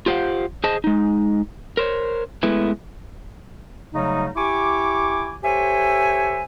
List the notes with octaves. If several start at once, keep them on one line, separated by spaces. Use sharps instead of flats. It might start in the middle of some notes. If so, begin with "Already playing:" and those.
F4 G4 C5 F5 F#5
G#4 C5 D#5 A5
G#3 D#4
A#4 C5 C#5
G#3 A3 B3 E4 B4
C#3 F#3 G3 A3 D#4
E4 G4 G#5 C#6 D6
G4 A4 C5 C#5 E5 G#5